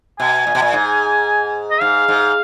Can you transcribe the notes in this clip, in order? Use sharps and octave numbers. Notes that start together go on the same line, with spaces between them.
B2 G#5
A#2
B2
A#2
G#2
D#5
G#2 F5
G#2